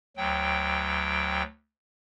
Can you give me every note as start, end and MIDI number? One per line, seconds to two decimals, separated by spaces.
0.17 1.43 38
0.17 1.43 54
0.17 1.43 79